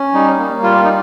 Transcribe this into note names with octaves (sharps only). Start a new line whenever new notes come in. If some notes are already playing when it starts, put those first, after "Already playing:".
Already playing: C#4
G3 D#4
A#3
G3 F4
D#4